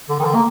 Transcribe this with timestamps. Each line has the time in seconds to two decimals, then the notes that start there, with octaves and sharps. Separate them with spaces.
0.09 D3
0.20 D#3
0.25 D3
0.35 A#3